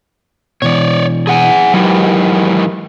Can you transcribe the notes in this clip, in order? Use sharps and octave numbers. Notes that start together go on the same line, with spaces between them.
B2 E3 C#5 D5
G#4 F#5 G#5
G#2 D#3 E3 F#3 G4 G5